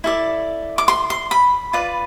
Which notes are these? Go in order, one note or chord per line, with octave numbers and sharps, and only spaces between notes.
E4 A4 D5
D6
C6
C6
B5
F4 B4 D5